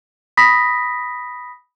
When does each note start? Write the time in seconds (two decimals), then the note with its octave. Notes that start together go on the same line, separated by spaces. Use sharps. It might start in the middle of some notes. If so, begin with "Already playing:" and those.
0.37 B5 D#6 A#6 B6